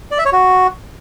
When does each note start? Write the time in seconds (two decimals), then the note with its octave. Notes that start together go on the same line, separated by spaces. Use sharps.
0.11 D5
0.18 E5
0.25 C#5
0.33 F#4